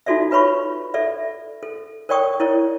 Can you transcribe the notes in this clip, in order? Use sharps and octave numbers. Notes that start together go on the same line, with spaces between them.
D#4 F4 F#4 A4 D5 E5
F4 B4 C#5 B5 C#6
A4 D5 E5
A4
A#4 C#5 D5 G5 C#6 D#6
E4 A#4 C#5 D5